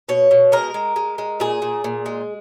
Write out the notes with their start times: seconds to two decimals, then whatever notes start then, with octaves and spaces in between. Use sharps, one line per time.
0.09 B2 C#5
0.31 B2
0.52 G#3 A#4
0.74 G#3
0.96 G#3
1.18 G#3
1.40 A#2 G#4
1.62 A#2
1.84 A#2
2.06 G#3